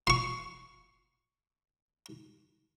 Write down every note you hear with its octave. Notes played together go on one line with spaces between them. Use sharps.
C6 C#6